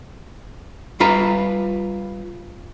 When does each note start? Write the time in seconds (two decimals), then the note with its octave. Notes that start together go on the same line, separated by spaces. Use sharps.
1.00 G3 F4 B4 A#5